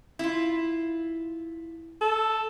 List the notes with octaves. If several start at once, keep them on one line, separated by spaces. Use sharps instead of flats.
E4 F4
A4